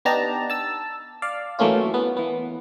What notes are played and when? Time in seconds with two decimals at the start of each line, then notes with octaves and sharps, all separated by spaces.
0.05 B3 D4 D#4 G4 A5 A#5
0.50 A5 E6
1.22 D5 F5
1.59 E3 F#3 A3 A#3 C#4 F4
1.94 B3
2.17 E3 B3